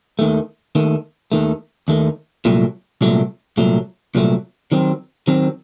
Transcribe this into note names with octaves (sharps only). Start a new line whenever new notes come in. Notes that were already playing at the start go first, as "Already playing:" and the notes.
D#2 D#3 A3
D#2 D#3 A3
D#2 D#3 A3
D#2 D#3 A3
C2 A#2 F#3 A3
C2 A#2 F#3 A3
C2 A#2 F#3 A3
C2 A#2 F#3 A3
D#3 F#3 C4
D#3 F#3 C4